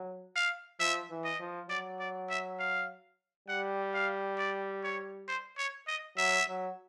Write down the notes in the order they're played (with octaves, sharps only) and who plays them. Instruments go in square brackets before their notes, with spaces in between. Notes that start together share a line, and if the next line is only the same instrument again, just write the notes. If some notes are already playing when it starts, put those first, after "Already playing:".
Already playing: [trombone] F#3
[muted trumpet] F5
[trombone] F3 [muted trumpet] E5
[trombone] E3
[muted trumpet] D#5
[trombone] F3
[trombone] F#3 [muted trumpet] D5
[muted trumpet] D5
E5
F5
[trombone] G3 [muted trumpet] F#5
[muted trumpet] F5
D5
C#5
C5
C#5
D#5
[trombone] F#3 [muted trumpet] E5
[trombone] F#3